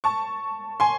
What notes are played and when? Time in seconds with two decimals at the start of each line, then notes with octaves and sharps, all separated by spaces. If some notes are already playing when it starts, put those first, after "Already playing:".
0.04 A5 C#6
0.80 G#5 C6